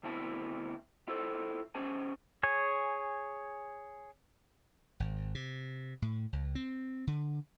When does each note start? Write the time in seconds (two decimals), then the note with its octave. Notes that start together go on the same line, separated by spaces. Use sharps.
0.03 D2 B2 C4 E4 A5
1.08 E4 F4 A4 C5
1.75 C#4 G#4 C5 G#5 A5
2.43 G#4 C#5 G#5
5.00 G#1
5.35 C3
6.02 A2
6.33 C#2
6.55 C4
7.07 D3